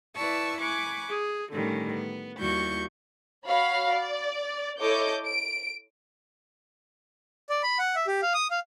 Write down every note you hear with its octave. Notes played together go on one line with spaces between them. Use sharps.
E4 B4 D5 A5 C#6 E6
G#5 B5 C#6 D6 F#6
G#4
A2 D3 D#3 G3 C#4
B3
D#2 G3 E4 F#4 C#6 G6
F#4 C#5 F5 B5
D5
E4 A4 C#5 D#5 D6 G6
D7
D5
B5
F#5
E5
G4
F5
D#6
F5